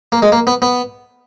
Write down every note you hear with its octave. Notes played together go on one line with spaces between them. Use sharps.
A#3
G#3
A#3
B3
B3